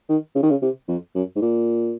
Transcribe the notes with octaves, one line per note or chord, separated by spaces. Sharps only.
D#3
C#3
D#3
C#3
C3
F2
F#2
G#2
A#2